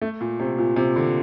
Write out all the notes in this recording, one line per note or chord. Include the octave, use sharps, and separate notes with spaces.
A3
A#2
C3
A#2
C3
D3